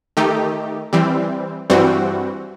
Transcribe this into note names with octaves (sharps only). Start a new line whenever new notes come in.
D#3 A3 D#4 G4
E3 G3 C4
G2 E3 G3 C4 F#4